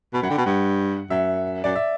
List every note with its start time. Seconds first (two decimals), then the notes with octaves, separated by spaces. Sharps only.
0.14 B2 B5
0.22 F#2 F#5
0.30 D3 G5
0.38 B2
0.46 G2 F#5
1.10 F#2 E5
1.64 F#2 D5
1.76 E5